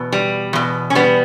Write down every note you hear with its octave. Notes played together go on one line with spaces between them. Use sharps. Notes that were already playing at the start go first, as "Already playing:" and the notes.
Already playing: E2 B2
G3
E2 B2
C#4
G3 B3